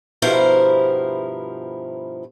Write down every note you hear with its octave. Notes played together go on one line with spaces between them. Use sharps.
G2 B2 F3 E4 A#4 C5